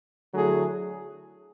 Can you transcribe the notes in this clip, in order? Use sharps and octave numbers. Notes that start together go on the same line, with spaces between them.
D3 F#3 A3 E4 G#4